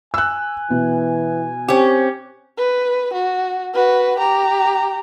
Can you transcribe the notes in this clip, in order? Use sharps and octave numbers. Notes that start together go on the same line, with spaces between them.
G#5 E6 F#6
B2 E3
C4 C#4 G4
B4
F#4
F#4 B4
G4 A#5